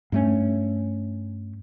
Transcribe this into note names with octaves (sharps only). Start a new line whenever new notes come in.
G2 A3 C#4